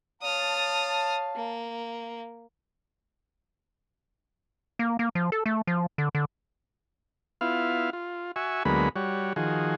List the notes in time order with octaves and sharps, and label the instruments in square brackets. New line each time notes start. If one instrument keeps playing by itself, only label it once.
[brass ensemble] C#5 F5 A5 [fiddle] D#6 F6
[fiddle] A#3
[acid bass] A#3
A#3
F3
A4
A3
F3
D3
D3
[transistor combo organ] B3 E4 F4 F5
F4
F#4 E5 G#5 C#6
D2 F#3 G#3 A#3 B3 B5
G3 F#4 C#5
D#3 F3 F#4 G#4